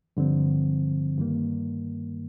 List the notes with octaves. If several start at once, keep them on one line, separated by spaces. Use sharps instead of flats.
G2 D3 F3 C4
G2 D#3 A#3